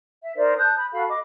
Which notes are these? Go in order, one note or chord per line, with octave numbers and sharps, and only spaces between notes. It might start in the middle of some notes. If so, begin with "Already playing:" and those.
E5
D#4 A#4 C5 D5
A5 D#6 F#6 G6
B5
F#4 A4 F5 B5
D#5 D6